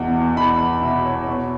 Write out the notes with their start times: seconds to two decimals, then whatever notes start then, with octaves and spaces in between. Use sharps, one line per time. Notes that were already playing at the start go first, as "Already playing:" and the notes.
Already playing: E2 B2
0.36 E2 B5
0.82 B2 E5
1.05 C#5
1.27 B2 C#5